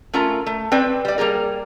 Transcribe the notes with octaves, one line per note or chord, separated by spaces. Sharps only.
A3 C#4 F4 A#4 A#5
A3
C4 B4 D5 G5
G3 D5
G3 A#3 G#4 A#4